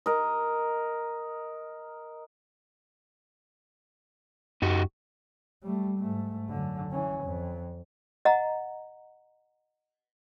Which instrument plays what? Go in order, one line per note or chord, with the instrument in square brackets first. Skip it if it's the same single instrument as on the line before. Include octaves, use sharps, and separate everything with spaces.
[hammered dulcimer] A#4 D#5
[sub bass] F#2 [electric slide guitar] D#4 F#4 G4
[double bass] G3 A3
G#2 A3
F#2 D3
E3 C#4
F2
[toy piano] D#5 F#5 A#5